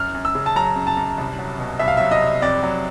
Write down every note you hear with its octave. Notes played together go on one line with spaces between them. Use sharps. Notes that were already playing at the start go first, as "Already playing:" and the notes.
Already playing: F#2 F6
F#2
E6
C#3
A5
F#3 A#5
F#2
A5
F#2
C2
F#3
B2
C2 E5
F5
F#3 E5
D#5
C2
F2 D5
F#3